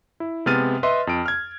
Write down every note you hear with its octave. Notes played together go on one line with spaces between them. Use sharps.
E4
C3 G#3 B3 F6 A6 D#7
B4 D#5 E5 C6
F2 D7
F6 G#6